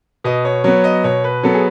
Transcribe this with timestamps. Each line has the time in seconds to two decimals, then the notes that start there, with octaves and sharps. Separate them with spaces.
0.24 B2 D#5
0.45 C#5
0.64 F#3 B3 C#5
0.84 D#5
1.04 B2 C#5
1.24 B4
1.43 F#3 B3 A4
1.54 G#4